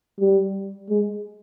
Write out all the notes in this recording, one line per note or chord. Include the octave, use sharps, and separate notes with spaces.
G3
G#3